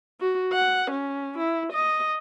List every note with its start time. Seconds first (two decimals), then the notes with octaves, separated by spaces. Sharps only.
0.21 F#4
0.53 F#5
0.91 C#4
1.38 E4
1.73 D#5